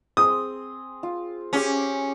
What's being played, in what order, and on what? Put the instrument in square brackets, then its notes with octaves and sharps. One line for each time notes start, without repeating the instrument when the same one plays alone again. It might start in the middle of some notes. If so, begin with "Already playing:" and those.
[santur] C4 G#4 C6 [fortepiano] D#6
[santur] F4
[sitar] C#4 [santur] G4 G#4 D6